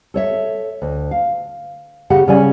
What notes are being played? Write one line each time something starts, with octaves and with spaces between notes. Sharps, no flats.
A4 C#5 E5
D2
F5
C#3 G4 F#5
C#3 G3 C#4 D5 G#5